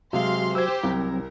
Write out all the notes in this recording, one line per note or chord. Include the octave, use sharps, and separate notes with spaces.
C3 F#3 G#3 F#4 F5 C6
G4 C5 E6 G#6
C2 F#3 C4 A#4